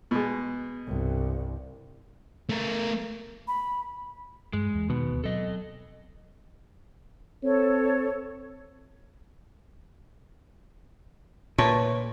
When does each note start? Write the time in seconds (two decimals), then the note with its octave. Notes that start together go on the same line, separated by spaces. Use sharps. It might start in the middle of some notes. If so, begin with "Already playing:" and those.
0.11 B2 G#3
0.87 C2 G2
2.49 A3 A#4
3.48 B5
4.53 G2 G#3
4.74 E2
4.89 B2 D#3 B3
5.11 D#1 D2
5.24 F#3 C4 A4 D#5
7.43 C4 A4 C#5
11.58 A#2 A3 B4 C#5